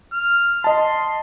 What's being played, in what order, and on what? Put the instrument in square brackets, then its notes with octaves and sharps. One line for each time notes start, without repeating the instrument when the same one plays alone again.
[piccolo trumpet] F6
[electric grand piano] D#5 A5 [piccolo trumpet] C6